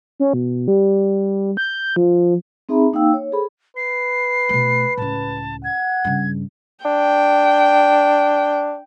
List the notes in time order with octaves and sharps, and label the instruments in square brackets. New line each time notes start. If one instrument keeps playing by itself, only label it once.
[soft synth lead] C#4
B2
G3
G6
F3
[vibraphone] C4 D#4 G#4 E5 A#5 B5
A#3 D#4 F5 G5 E6
C#5
G#4 A4 C5 B5
[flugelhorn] B4 [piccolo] C7
[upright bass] B2 A3
[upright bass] C#2 A2 [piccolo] A5
[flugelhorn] F#5 [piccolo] G#6
[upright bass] G2 C#3
[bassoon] D4 [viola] G5